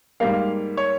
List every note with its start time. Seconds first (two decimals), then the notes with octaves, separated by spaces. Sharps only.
0.20 G#2 G3 A#3 F5
0.77 C#5